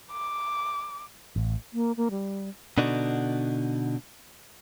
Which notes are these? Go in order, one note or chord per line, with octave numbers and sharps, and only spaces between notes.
D6
A1
A#3
A#3
G3
B2 D3 D4 D#4 F#4